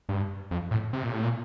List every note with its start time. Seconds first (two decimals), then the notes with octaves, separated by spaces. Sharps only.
0.09 G2
0.51 F2
0.71 A2
0.93 C3
1.03 A#2
1.12 A2
1.23 A#2